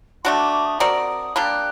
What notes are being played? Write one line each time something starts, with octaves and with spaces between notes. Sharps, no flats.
A3 D4 F#4 C6
D6
D6
D#6
C4 F#4 A#4 D5 D#6
G3 A#3 D4 G4 F#6